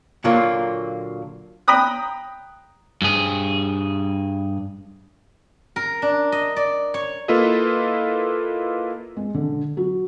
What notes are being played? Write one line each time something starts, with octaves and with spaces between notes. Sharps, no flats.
A#2 D3 F#3 A#3 F4
G5 A#5 B5 D#6 F#6
G2 G#4
A#4
D4
D#5
D5
C#5
A#3 E4 F4 A4 B4 D#5
G#3
D3
F#3